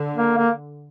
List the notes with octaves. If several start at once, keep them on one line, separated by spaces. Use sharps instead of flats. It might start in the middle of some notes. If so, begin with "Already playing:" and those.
Already playing: D3
A#3
A#3